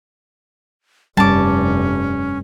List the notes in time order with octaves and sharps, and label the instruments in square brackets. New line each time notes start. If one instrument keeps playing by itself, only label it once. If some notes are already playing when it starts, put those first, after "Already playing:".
[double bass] F1 G2 [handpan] G3 [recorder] C#4 [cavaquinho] A5 D6